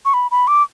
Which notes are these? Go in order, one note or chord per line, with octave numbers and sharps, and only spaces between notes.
C#6
B5
B5
D6